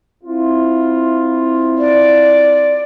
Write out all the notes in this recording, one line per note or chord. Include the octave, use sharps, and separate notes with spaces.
C4 E4 F4
D5